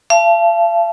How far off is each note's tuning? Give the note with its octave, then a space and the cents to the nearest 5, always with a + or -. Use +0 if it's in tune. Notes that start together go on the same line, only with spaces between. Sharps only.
F5 -40 A5 -20